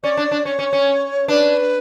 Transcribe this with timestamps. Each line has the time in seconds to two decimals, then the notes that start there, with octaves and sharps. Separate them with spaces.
0.03 C#4 D5
0.17 D4
0.32 D4
0.45 C#4 C#5
0.59 C#4
0.73 C#4
1.28 D4 B4